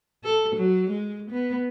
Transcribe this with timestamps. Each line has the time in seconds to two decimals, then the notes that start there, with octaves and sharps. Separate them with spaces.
0.24 A4
0.56 F#3
0.90 G#3
1.31 B3